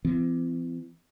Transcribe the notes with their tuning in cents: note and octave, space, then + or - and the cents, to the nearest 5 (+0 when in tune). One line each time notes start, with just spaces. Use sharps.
E3 +40 C4 -35